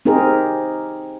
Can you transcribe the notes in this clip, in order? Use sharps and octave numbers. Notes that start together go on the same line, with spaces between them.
C4 D#4 G4 G#4 A#4